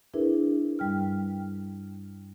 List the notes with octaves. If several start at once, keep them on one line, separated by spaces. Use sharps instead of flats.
D4 E4 G#4 A#4 B4 E5
G2 G3 G5 F6